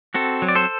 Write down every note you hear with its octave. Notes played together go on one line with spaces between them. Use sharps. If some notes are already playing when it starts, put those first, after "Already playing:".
C4 F#4 A4
F#3
D5
A4 C5